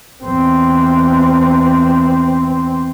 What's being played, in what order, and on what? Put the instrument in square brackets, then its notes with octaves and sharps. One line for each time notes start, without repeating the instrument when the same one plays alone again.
[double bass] E2 C4